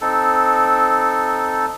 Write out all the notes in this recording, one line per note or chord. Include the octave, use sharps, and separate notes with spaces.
C4 D#4 A4